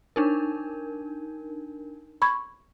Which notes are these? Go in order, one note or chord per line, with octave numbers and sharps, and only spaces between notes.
D4 D#4 A#4
B5 C#6 G#6